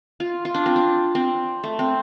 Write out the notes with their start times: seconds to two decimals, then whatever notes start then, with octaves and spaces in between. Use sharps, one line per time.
0.20 F4
0.45 F4
0.54 D4
0.66 C4
0.76 D4
1.15 C4
1.64 A3
1.79 C4